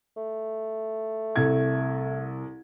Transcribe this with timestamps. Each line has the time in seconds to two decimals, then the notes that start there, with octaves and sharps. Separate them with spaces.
0.17 A3
1.36 C2 A4 G#6